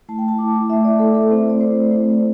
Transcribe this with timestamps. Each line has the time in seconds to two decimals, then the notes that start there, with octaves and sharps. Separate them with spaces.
0.09 A3 E4 A5
0.18 G5
0.28 A5
0.39 A3 E4 D6
0.54 A5
0.70 A3 E4 E5
0.84 D5
0.99 A3 E4 A4
1.15 A4
1.30 A3 C4 E4 C5
1.50 D5
1.60 A3 C4 E4 C5
1.91 A3 C4 E4